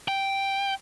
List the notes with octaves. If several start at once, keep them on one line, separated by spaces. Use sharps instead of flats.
G5